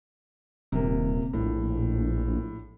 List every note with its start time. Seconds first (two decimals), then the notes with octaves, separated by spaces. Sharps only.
0.72 D#1 C3 A#3
1.33 A#1 A2